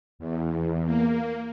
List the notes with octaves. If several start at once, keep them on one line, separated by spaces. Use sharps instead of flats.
E2
A#3